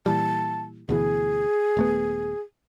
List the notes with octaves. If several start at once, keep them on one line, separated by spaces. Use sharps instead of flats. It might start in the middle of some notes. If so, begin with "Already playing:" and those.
A#2 E3 G3 A5
D2 B2 E3 G#4
D#1 A3 B3